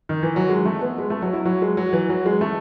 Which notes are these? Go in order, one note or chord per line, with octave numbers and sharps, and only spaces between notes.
D#3
E3
F#3
G#3
A3
B3
G#3
A3
F#3
E4
F#3
G#3
F#3
E3
F#3
G#3
A3